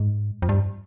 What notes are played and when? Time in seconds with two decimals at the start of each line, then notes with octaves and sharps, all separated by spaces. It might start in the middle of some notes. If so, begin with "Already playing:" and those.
Already playing: G#2
0.42 F2
0.49 G2